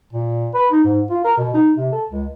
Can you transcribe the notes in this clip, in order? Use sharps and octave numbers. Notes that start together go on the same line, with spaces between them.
A#2
B4
D#4
G#2
F4
A#4
B2
D#4
C3
A4
C#2